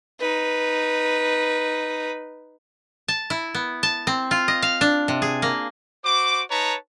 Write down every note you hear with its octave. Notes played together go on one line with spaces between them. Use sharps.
D#4 B4
A5
E4
B3
A5
C4
F4
D#5
F5
D4
C3
G#4
A#3
F#4 C5 D6
D#4 B4 C#5 A5 A#5